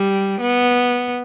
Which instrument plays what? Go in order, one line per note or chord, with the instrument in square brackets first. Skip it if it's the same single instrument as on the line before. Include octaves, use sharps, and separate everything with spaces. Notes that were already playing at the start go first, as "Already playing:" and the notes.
Already playing: [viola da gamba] G3
B3